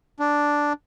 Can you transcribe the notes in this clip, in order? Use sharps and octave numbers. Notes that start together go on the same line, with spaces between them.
D4